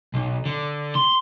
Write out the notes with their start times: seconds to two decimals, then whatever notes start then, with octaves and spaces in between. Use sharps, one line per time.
0.14 B1
0.46 D3
0.95 C6